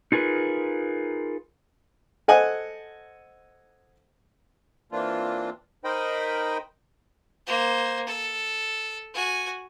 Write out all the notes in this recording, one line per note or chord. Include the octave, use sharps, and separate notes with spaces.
D#4 F4 G#4 A#4 B4
A4 C5 D#5 F#5 G#5
E3 A#3 C4 D4 F4
D#4 A#4 C5 D#5 G5 B5
A#3 C5
A4
F#4 G#5